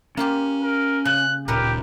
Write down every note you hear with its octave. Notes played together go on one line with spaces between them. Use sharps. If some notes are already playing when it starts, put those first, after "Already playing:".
A#3 C#4 F4 G4
A#4
C#3 F#6
D1 A#2 G4 A#4 B4 C#5